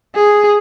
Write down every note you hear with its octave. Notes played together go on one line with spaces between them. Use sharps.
G#4